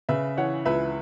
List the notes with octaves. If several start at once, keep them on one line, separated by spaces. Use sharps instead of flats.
C#3 B4 E5
E3 C#5 F#5
C#2 B4 E5